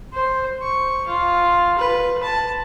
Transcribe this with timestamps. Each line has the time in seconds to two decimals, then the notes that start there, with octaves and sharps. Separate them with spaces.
0.13 C5
0.62 C#6
1.07 F4
1.78 B4
2.23 A5